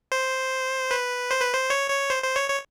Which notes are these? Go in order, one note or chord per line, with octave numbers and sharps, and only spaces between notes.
C5
B4
C5
B4
C5
C#5
C#5
C5
C5
C#5
C#5